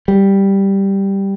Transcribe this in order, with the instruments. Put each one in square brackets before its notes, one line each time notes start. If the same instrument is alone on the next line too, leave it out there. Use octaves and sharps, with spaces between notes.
[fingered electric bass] G3